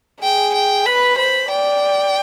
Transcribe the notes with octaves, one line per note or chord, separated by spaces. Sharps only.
G#4 G5
G5
B4 B5
C5 B5
D5 G5